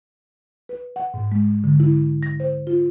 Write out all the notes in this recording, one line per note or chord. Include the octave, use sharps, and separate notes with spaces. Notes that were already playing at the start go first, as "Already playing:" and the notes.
B4
F#5
G#2
G#3
D3
E4
A#6
C5
F4